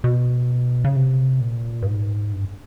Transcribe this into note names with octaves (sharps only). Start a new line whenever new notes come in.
B2
C#3
C3
A#2
G2
G#2
G2